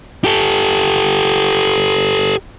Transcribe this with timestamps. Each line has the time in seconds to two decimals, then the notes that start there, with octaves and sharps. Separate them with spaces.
0.24 G4 A4